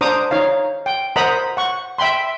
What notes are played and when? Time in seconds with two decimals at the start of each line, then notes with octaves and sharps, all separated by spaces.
0.01 D4 C5 A#5 D6 D#6
0.31 D#4 C#5 F5
0.86 G5
1.16 A#4 C5 D#5 F#5 A#5 B5
1.57 F#5 C#6
1.98 E5 G5 B5 C6